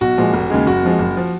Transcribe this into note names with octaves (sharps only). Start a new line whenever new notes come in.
B1 F#4
A#2 F3 G#3
F1
D#2 C#3 G#3
F#1 F#4
F2 F3 G#3
F#1
F3